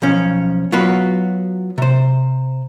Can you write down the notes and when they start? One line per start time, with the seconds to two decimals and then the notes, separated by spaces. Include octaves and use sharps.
0.02 B1 F3 C#4
0.72 F#3 B3 F4 F#4 B4
1.78 C3 C5